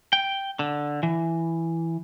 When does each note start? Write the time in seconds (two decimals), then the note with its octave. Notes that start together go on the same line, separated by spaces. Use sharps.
0.13 G5
0.59 D3
1.03 E3